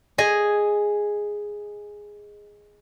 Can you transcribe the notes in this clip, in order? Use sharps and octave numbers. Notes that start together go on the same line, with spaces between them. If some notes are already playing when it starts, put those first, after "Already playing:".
G#4 D#5 G#5